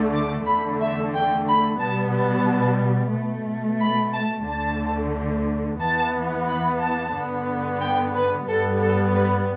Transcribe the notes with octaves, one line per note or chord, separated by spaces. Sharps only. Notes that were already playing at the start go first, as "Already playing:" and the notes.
Already playing: D2 D3 A3
D6
E2 D3 A3 B5
E5
G5
B5
B2 G3 B3 A5
A5
B2 A3
B5
A5
D2 D3 A3 A5
E2 E3 B3 A5
B5
A5
G2 D3 B3
G5
B4
G2 G3 B3 A4
A4
B4